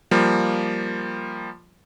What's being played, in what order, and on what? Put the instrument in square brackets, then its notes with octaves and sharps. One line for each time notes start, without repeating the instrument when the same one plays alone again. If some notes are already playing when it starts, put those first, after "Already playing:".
[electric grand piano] F3 G3 A#3